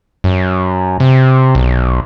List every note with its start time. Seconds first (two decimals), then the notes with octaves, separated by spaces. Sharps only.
0.24 F#2
1.00 C3
1.55 B1